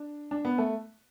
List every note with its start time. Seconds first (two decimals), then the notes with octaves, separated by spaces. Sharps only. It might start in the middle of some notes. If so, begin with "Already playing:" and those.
Already playing: D4
0.31 D4
0.45 B3
0.58 A3